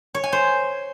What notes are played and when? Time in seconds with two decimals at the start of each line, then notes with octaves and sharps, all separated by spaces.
0.15 C#5
0.24 G#5
0.33 C5